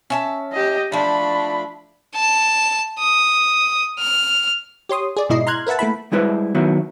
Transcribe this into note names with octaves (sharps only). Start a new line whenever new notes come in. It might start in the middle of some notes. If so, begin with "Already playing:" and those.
C#4 E5 A5
G4 D#5
F3 A3 D4 B5
A5
D#6
F6
G4 C#5 C6 D#6
G#4 D5
G#2 B2 E4 D#5 C7
A#5 C6 F6 F#6 G#6
A#4 B4 E5 F#5 A5
A3 A#3 E4 B5
G3 G#3 E4 B4 C5
D#3 F#3 B3 E4